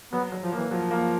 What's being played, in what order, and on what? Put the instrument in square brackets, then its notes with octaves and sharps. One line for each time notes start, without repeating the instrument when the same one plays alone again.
[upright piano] F#3 [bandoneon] B3
[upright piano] F#3
[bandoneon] F3
[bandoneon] E3 [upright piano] A#3
[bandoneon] F3 [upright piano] F#3
[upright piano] A#3